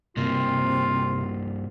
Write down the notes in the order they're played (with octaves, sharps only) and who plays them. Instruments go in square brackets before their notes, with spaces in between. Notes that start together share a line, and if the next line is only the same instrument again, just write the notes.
[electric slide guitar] G2 A#3 [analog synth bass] C3 [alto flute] C4 [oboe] F4